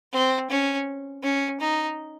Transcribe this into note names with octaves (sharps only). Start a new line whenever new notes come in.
C4
C#4
C#4
D#4